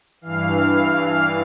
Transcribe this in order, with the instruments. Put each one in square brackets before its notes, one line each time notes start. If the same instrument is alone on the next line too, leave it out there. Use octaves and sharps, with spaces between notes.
[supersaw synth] G2 E3 F5